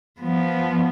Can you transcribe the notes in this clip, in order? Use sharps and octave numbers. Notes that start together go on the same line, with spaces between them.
F3 B3